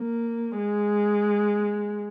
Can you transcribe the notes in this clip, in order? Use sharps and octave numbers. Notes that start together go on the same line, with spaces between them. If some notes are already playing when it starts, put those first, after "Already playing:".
Already playing: A#3
G#3